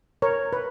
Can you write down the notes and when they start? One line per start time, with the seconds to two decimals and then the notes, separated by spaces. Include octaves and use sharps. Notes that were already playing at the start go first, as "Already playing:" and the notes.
0.22 A#4 C#5
0.53 B4